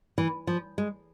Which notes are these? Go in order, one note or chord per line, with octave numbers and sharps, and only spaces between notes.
E3
F3
G#3